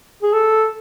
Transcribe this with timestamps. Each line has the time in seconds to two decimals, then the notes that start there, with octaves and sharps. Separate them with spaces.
0.23 G#4
0.33 A4